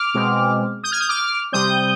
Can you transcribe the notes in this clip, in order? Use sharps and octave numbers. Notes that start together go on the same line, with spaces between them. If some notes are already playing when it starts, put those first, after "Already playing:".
Already playing: D6 F6
B2 G#3 C4
D#6 G6
F6 G#6
D#6 G6
D6 F6
C3 G3 C4 D#6 G6